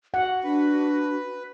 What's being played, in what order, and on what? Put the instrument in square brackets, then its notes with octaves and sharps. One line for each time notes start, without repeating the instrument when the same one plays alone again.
[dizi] F#4 [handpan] F#5
[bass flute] D4 [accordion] B4